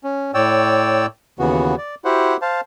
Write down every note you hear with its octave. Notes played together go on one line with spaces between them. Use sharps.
C#4
A2 C#5 D5 G5 E6
D#2 C#3 E3 B3 F#4
D5
E4 F#4 G4 C5 F#5
C5 F5 A5